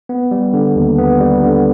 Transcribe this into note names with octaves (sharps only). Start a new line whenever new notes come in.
B3
G3
D3
D#2
B3
G3
D3